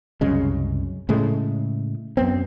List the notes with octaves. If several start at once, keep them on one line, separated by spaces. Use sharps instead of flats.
C2 F#2 C#3 G#3
A2 C#3 G#3 A3
F#2 B3 C4